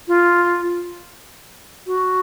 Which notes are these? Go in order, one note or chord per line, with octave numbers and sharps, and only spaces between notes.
F4
F#4